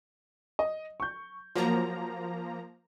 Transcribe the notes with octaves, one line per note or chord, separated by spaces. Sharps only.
D#5
C#6 G6
F3 F#3 A#3 A#5